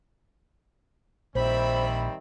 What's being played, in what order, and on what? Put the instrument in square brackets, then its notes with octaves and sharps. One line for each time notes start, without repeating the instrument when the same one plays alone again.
[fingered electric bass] A#1 [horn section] D#3 G3 C4 [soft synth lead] C5 [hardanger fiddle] E5 B5